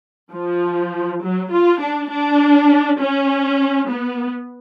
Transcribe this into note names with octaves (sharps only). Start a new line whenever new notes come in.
F3
F#3
F4
D4
D4
C#4
B3